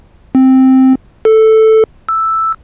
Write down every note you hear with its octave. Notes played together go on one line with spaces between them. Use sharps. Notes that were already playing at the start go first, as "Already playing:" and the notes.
C4
A4
E6